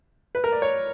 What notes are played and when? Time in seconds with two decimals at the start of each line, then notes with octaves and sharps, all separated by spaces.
0.35 B4
0.44 A#4
0.52 D5
0.62 C#5